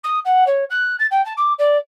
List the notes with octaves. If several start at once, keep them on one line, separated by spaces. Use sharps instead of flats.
D#6
F#5
C#5
F#6
A6
G5
A5
D6
D5